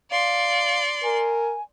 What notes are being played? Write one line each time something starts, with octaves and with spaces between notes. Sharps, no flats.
D5 F5 C6
A#4 G#5